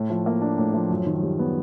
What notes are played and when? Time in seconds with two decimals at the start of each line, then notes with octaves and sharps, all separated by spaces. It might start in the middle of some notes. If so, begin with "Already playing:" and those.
Already playing: A2
0.10 F3
0.26 A#3
0.42 D4
0.58 A2
0.74 F3
0.90 F#2
1.06 D#3
1.23 G3
1.39 B3